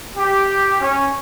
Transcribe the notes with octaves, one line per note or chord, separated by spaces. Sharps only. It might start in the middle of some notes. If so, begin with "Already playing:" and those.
G4
C#4